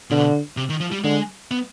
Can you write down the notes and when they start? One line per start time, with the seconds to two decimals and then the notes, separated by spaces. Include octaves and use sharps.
0.10 B2 D3
0.57 C3
0.70 D#3
0.81 F3
0.92 G3
1.04 D3 G#3
1.51 B3